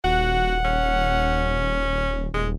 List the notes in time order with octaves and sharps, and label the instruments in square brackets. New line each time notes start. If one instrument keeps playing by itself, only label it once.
[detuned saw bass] D#1 [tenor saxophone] F#4 [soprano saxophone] F#5
[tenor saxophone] C#4
[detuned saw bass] D#1 [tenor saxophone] G#3